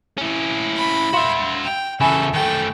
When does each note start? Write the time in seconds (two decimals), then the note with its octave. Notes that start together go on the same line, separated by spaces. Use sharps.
0.18 C#4 E4
0.77 B5
1.14 F#4 E5 F5 C6 E7
1.65 G5 F7
2.01 E2 C#3 A4 E5 G#5 B5 C#6
2.34 D#3 A3 G5